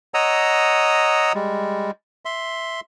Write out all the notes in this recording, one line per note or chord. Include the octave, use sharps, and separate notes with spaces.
C#5 D#5 F#5 A#5 D#6 E6
G3 G#3
E5 C6